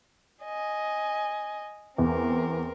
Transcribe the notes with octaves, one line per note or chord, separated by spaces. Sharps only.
D#5 G#5
E2 C4 A#4